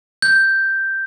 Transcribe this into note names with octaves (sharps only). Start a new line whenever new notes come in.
G6